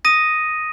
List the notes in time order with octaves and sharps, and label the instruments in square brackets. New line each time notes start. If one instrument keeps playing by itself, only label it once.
[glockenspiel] D#6 A#6 D#7